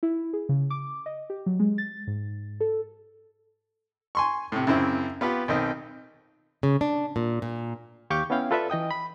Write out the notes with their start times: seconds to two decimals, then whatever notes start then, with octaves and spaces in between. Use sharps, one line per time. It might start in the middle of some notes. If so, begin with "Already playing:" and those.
0.03 E4
0.33 G#4
0.49 C#3
0.70 D6
1.06 D#5
1.30 G4
1.46 F#3
1.60 G#3
1.78 A6
2.07 G#2
2.61 A4
4.15 G#5 C6 C#6
4.52 A2 C3
4.67 F#2 C#3 C4 E4
5.21 B3 F4 G4 B4
5.48 B1 D#3 C4 D#5
6.63 C#3
6.81 D4
7.16 A#2
7.42 A#2
8.10 D#2 G4 F5 C#6 D6 G6
8.30 B3 C#4 E4 F5 G5
8.51 F4 A4 B4 D5 E5
8.70 E3 D#5 G5 D#6
8.91 B5